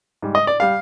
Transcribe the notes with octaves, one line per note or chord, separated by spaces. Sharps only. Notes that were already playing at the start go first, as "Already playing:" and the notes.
G#2 G3
D#5
D5
G3 F5